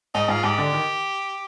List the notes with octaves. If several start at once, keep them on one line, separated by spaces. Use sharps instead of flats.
G#2 D#4
G#2 F4
G#2 G4
D3
D#3